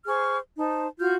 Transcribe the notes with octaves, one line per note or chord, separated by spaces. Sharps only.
G#4 C5 C#6 F6
D#4 C5 A5
F4 F#4 F6 G6